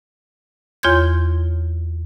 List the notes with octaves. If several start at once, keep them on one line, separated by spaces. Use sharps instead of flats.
E2 F4 C#5 C6 G6 G#6